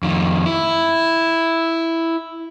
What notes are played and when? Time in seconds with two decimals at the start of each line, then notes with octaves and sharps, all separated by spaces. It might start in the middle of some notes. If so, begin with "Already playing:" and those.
0.03 F2 D#3
0.46 E4